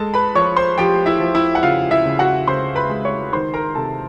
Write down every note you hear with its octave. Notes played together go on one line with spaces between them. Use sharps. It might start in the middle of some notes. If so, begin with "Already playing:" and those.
Already playing: G#3 A4 A5
B4 B5
F3 C#5 C#6
C5 C6
F3 G4 G5
E4 E5
F3
E4 E5
F#5
C#3 F4 F5
E4 E5
C#3
F#4 F#5
C#3 C5 C6
B4 B5
G#3
C#5 C#6
D#3 C5 C6
A#4 A#5
C3 A4 A5